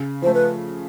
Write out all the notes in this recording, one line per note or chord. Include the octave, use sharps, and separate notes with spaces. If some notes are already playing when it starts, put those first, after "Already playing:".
Already playing: C#3
F3 A3 C5
B4